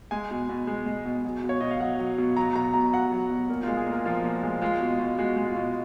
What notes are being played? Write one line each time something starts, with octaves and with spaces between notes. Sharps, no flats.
G#3 G#5
B2
B2
G#3
G#3
B2
F#3
B2
C#5
B2 D#5
F5
F#3 F#5
F#3
B2
F#3 A#5
B2 A#5
B2 A#5
F#3 F#5
F#3
B2
A#2 A#4
G#3 F4
G#4
A#2 A#4
F3 F4
A#2
G#3
G#3 F4
B2
B2
G#3 F#4
G#3
F4
B2